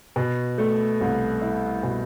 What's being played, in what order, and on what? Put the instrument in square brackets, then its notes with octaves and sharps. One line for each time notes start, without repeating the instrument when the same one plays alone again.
[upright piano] B2
A3
C2
E4
B2